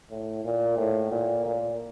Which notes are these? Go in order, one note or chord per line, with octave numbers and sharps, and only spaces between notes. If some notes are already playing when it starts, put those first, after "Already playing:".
A2
A#2
A2
A#2
A#2